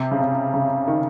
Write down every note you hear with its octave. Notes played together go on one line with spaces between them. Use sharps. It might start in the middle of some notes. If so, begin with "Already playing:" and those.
Already playing: C3
C#3
C3
C#3
D#3